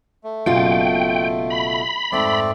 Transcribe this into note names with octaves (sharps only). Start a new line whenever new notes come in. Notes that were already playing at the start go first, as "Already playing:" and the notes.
A3
F#1 B2 F4 G5
B5
F2 G#2 A3 C4 D5